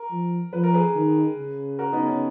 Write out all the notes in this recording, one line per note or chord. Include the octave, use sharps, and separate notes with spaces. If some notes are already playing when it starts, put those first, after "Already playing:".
Already playing: A#4
F3
F3 B4
A#4
G#4 B4
D#3
C#3
F#4 A#4
B3 D#4
C#4